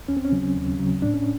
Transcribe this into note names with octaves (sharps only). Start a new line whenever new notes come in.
D#2 C#4
C4
C#4
C#3 F#3
D#2
C#3 F#3
A2 D4
C#4